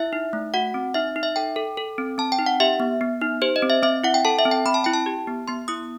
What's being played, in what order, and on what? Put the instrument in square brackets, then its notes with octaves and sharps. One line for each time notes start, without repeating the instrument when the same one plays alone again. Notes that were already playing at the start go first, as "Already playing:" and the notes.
Already playing: [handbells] E4 E5
D#4
A3
F#4 F#5
C4
D#4 E5
D#4
E5
A4 G5
A4
A4
C4
C4 A5
G5
D#4
F#5
G4 E5
B3
B3
D#4
G4 C5
D#5
C4
E5
C4 E5
E4 F#5
G5
A4 A5
E5
C4
G5
C4 B5
A5
E4 G5
A5
G4
B3
B3 C6
E4 D#6